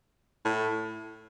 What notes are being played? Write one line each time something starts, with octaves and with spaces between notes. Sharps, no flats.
A2